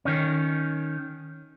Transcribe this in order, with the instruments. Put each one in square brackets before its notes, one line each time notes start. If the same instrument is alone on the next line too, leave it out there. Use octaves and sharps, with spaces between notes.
[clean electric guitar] D#3 C#4